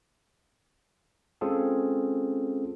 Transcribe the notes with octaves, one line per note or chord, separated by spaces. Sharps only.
G#3 C4 C#4 F4 G#4 A4